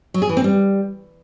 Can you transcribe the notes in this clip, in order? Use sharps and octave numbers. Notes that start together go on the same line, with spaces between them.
F#3
G#4
E3
C4
G3